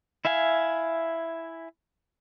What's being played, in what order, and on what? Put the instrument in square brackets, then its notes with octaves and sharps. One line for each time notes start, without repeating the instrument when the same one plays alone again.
[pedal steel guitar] E4 E5 F5 G#5